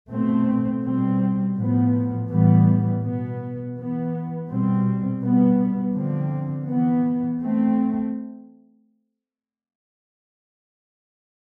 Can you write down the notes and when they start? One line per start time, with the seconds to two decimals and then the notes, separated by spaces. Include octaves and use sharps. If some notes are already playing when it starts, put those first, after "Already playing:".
0.10 B2 A3 C4
0.83 B2 G3 C4
1.56 A2 F3 B3
2.29 A2 E3 G3 B3
3.02 B2 B3
3.75 E3 B3
4.48 B2 G3 C4
5.21 B2 G3 B3
5.94 D3 F3 C4
6.67 E3 B3
7.40 A3 C4